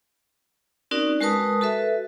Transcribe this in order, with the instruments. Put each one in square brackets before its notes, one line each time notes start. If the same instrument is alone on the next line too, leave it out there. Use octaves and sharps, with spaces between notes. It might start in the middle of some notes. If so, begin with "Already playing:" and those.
[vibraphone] C4 C#4 D#4 F#4 A#4 D5
G#3 F#4 A#4 B4 A5 D#6
F#4 A4 B4 E5